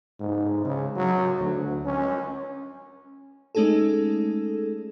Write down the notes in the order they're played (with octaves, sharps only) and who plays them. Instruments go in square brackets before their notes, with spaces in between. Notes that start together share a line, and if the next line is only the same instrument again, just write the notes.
[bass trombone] G#2
C#3
F#3
D2
C#4
[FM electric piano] G#3 A3 C#4 D#4 G#4 A4